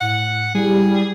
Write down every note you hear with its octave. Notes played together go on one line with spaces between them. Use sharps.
A2 F#5
G3 E4 G#4